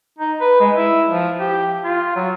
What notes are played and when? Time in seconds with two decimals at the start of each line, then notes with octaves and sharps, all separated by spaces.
0.18 D#4
0.41 B4
0.60 G#3
0.75 E4
1.10 F3
1.40 G4
1.84 F4
2.16 F#3